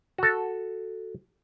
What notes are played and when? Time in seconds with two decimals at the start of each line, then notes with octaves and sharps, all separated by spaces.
0.18 F#4 A4